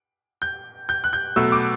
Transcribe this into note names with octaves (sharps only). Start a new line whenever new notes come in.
G6
G6
F#6
G6
B2 F#3 A3 E6
D6